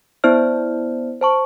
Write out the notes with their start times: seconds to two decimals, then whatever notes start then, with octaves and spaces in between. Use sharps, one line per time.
0.24 B3 E4 C5 D5 F6
1.21 C5 A5 C#6